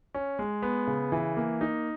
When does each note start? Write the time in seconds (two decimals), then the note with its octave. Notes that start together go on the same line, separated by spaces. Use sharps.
0.14 C#4
0.39 G#3
0.62 B3
0.87 C#3
1.12 E3
1.37 A#3
1.61 D#4